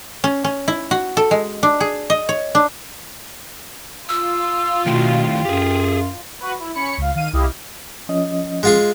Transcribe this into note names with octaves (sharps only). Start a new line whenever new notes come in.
C#4
C#4
E4
F#4
A4
G#3
D4
G#4
D#5
C#5
D4
F4 E6
B2 D#3 A3 E4 G5
F#2 G4 G#4
F#4 B4
E4
C#4 C#5 B5 C#7
C#2 F5
D#3 F5 D#7
C2 E4 G4 D#5 F5
F3 C#4 D#5
G#3 F4 G#4